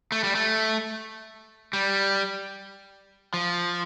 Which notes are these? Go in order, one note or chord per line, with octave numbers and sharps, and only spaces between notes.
A3
G3
A3
G3
F3